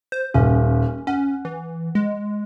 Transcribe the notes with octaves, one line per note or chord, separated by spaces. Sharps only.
C5
D#1 C#4
C#4 F#5
E3
G#3